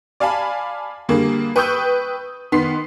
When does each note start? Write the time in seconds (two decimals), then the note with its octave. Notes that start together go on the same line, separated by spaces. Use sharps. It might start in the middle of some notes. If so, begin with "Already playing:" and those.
0.20 D5 F5 G#5 A5 B5
1.09 D3 G3 A#3 G#4
1.56 B4 G5 C#6 D#6 E6 G6
2.52 D#3 B3 C6 B6 C7